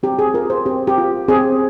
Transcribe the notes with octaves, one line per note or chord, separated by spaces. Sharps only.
C4 G4
G#4
F4 A#4
C5
C4 G4
G4
F4
C4 G#4